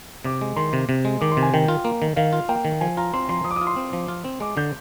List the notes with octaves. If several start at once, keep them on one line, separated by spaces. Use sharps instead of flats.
C3 D6
G#3
D#3 C6
C3
C3
G#3
D#3 D6
C6
C3
G#5
D#3 G5
F4
A#3
D#3
D#3 F5
F4
A#3 G5
D#3
F3 G#5
F4 A#5
C4 C6
F3 C6
F3 D#6
D6
D#6
F4
C6
C4
F3
F4
C4
G#3 D6
D3 G6